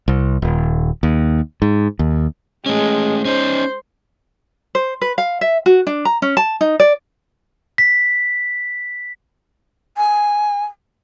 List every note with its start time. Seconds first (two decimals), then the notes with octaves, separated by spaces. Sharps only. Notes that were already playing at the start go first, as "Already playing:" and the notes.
0.08 C2
0.42 D#1
1.03 D#2
1.62 G#2
1.99 D#2
2.66 G#3 A3 C#4
3.25 C#4 D#4 C5
4.75 C5
5.01 B4
5.18 F5
5.41 E5
5.66 F#4
5.87 D4
6.05 A#5
6.22 C#4
6.37 A5
6.61 D#4
6.80 D5
7.78 B6
9.97 G#5